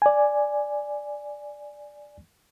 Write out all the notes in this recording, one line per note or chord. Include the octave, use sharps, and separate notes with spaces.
D5 G#5